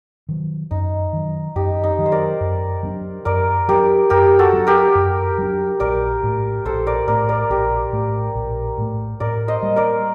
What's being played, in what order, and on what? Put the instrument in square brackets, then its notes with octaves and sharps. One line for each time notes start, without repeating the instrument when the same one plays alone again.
[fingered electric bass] D#3 F#3
[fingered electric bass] F#2 [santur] D#4
[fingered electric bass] D#3 F#3
[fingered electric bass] F#2 [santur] D#4 G4
[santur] D#4
[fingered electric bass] D#3 F#3
[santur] C5
A#4 D5
[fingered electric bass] F#2
F#3 A3 D4
[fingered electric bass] F#2 [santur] A#4 D5
[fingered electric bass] F#3 A3 D4 [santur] G4 A#4
[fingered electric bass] F#2 [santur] G4 A#4
[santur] F#4 A4
[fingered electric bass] F#3 A3 D4
[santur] G4 A#4
[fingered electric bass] F#2
F#3 A3 D4
[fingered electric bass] A#1 [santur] A#4 D5
[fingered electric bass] A2 A3
[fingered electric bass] A#1 [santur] A4 C5
[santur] A#4 D5
[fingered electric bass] A2 A3 [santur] A#4 D5
[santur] A#4 D5
[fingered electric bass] A#1 [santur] G4 A#4
[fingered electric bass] A2 A3
A#1
A2 A3
[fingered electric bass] A2 [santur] A#4 D5
[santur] C5 D#5
[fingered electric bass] G3 A#3
[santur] A#4 D5